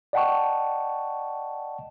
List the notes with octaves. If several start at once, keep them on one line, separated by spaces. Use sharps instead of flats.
D5 D#5 F#5 G5 A5 C#6